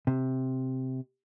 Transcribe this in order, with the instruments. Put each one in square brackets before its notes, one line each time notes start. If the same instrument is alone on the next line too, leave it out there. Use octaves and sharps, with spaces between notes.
[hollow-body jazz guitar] C3